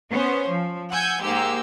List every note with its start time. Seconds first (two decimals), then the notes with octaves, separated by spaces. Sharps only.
0.11 B3 C#4 C5
0.49 F3
0.92 F#5 G#5 E6 G6 G#6
1.23 G#2 G#3 A#3 G4 E6